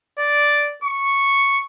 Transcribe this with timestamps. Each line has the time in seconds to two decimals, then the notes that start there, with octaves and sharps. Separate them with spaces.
0.19 D5
0.84 C#6